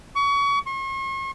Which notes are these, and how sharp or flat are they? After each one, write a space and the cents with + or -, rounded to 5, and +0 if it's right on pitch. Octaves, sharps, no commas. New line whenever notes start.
C#6 +30
C#6 -45